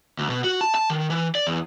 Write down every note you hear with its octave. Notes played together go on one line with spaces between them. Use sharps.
D2
B2
F#4
A5
A5
D#3
E3
D5
E2